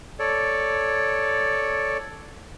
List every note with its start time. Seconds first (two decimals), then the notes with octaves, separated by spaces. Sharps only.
0.19 A4 C#5 D5